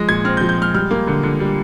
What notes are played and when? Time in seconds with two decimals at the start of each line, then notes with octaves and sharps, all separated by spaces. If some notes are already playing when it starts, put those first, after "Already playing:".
Already playing: F3 G#3 A#6
0.09 A#2 G#6
0.25 C4 F6
0.37 G6
0.41 F3
0.49 G6
0.57 G#3 F6
0.74 G3 F6
0.91 A#3
1.07 D3
1.23 D3
1.40 G3